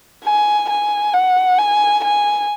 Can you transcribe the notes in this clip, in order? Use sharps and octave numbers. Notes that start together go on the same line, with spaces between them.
G#5
G#5
F#5
G#5
G#5